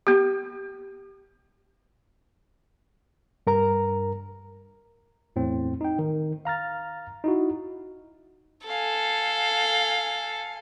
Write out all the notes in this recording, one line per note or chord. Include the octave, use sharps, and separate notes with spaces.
B3 G4
G2 A#4 A#5
E2 A2 C4
D#4 G5
D#3
F5 A#5 F6 A6
D#4 E4 F#4
A4 F5 G#5